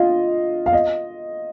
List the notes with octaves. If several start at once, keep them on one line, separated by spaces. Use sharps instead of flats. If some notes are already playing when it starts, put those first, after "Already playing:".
Already playing: F4 D#5 F5
F5
D#5